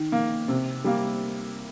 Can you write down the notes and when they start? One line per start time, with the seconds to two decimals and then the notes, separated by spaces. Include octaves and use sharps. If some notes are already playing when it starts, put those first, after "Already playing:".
Already playing: D#3
0.12 A#3
0.48 C3
0.84 G3 A#3